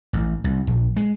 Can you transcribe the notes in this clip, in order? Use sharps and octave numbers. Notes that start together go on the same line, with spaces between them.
A1
C2
A#1
G#3